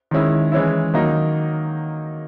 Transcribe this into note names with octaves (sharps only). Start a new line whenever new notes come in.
D#3 G#3 C#4 E4
E3 G#3 C#4 E4
D#3 F#3 A#3 D#4